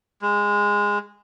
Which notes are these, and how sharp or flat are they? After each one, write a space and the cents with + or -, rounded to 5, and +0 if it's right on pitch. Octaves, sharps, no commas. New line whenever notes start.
G#3 -15